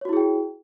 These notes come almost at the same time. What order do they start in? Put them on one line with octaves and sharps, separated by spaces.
C#5 F#4 E4 G#4 G5